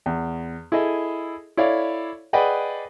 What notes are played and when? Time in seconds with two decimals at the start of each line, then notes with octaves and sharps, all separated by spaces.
0.06 E2
0.72 E4 G#4 A4 D#5
1.57 E4 A4 C#5 D5 F5
2.33 G#4 B4 D5 D#5 F#5 G5